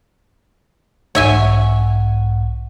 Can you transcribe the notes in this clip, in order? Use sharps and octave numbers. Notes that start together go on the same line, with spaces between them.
B1 G#2 C#5 E5 F#5 G#5